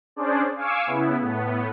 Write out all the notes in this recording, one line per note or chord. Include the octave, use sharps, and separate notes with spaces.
C#4 D4 G#4 C5 D5
F5 G#5 C#6 D6 E6
C#3 B3 E4
A2 B3